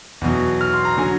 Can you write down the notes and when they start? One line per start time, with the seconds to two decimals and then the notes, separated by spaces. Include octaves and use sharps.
0.21 E2 B2 F#3
0.61 F6
0.73 C6
0.85 A#5
0.98 D3 F#3 G#5